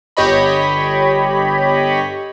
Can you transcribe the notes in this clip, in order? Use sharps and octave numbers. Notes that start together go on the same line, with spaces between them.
G1 G4 C#5 D#5 B5